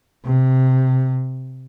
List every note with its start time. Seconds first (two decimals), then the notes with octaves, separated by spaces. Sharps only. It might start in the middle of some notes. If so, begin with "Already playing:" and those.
0.25 C3